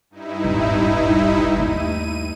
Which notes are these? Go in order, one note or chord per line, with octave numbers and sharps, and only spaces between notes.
G2 D#4 E4
D#1 G#1
D#2 A3 D#7